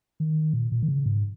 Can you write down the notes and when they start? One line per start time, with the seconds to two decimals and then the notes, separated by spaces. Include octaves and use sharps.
0.20 D#3
0.53 A#2
0.72 A#2
0.82 D#3
0.88 C#3
1.06 G#2